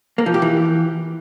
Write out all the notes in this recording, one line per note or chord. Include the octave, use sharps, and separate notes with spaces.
A#3
F3
G4
E3